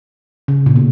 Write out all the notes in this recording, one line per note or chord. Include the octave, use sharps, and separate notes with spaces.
C#3
A#2
B2